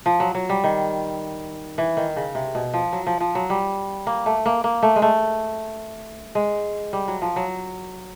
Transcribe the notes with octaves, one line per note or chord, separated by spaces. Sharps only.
F3
F#3
F#3
G3
D#3
E3
D#3
C#3
C3
B2
F3
F#3
F3
F3
F#3
G3
A#3
A3
A#3
A#3
A3
G#3
A3
G#3
G3
F#3
F3
F#3